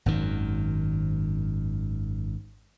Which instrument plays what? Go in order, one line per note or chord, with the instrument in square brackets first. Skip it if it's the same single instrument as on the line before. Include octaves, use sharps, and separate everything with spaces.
[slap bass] G#1 F#2 D#3